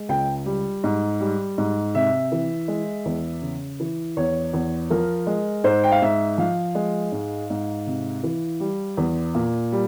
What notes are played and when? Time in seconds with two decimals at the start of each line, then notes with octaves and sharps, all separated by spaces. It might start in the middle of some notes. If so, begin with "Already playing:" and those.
Already playing: G#3
0.09 C#2 G5
0.46 G3
0.83 G#2
1.20 G3
1.58 G#2
1.95 C3 E5
2.32 E3
2.68 G#3
3.05 E2
3.42 C#3
3.80 E3
4.17 E2 C#5
4.53 E2
4.90 F3 A#4
5.27 G#3
5.64 G#2 C5
5.83 G5
5.92 F5
6.02 G#2 E5
6.38 F3 F5
6.75 G#3
7.12 G#2
7.50 G#2
7.87 C3
8.23 E3
8.60 G3
8.97 E2
9.35 A#2
9.72 G3